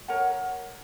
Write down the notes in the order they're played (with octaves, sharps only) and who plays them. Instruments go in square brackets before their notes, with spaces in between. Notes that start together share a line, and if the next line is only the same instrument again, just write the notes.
[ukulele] A#4 C#5 F#5 A#5